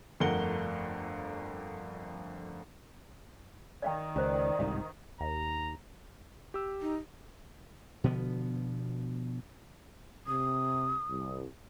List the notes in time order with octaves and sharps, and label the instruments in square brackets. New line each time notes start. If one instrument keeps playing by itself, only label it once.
[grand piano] G1 F2 A3 A#4 F#5 G7
[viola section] D#3 [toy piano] D5 F5 G5
[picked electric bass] C#2 [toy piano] C#4 C5 [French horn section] A#4 D5
[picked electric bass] G1 C2 G#2 [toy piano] F5
[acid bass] D#2 [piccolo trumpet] A#5
[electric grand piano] G4 E6
[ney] D#4
[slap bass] B2 D3 F3 B3
[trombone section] C3 [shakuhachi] D#6
[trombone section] C2